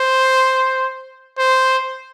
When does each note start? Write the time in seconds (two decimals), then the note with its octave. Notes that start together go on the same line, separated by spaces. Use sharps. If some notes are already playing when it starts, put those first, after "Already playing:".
Already playing: C5
1.38 C5